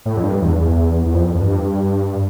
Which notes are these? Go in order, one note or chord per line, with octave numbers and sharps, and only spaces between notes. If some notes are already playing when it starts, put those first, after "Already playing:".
A2
F2
G2
E2
E2
E2
F2
F2
G2